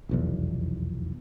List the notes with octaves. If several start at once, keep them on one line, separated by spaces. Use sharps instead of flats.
F1 B1 E2